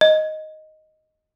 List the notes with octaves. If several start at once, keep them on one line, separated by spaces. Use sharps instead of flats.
D#5